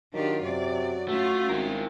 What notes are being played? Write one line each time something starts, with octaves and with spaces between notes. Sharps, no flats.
D#3 F#3 D4 F4 G4
F#2 C3 D5
A3 C#4 F4 F#4
G#1 E4 A#4